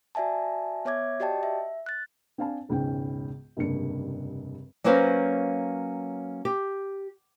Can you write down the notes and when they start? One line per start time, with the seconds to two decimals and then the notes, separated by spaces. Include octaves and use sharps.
0.15 F#4 D5 E5 G#5 A5
0.85 B3 C#5 E5 D6 G#6
1.20 F#4 G4 D5 D#5 G5 A5
1.43 E5
1.86 F#6 A6
2.38 C4 D4 F5 G#5 A5
2.69 E1 C#2 G#2 C#4 G5
3.57 F1 C#2 G2 A#3 D4 C#7
4.84 F#3 A#3 C#4 B4 C5 F5
6.45 G4